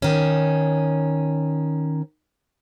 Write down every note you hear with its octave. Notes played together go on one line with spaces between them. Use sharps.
D#3 C#4